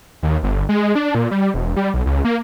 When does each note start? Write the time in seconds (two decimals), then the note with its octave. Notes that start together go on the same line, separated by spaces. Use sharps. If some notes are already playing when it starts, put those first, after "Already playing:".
0.23 D#2
0.43 G1
0.69 G#3
0.95 D4
1.15 A#2
1.31 G3
1.54 E1
1.76 G3
1.94 B1
2.06 C#2
2.25 A#3